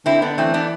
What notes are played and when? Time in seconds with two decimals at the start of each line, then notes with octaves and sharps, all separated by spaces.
0.06 D3 C4 E4
0.22 B3 D4
0.38 E3 A3 C4
0.54 B3 D4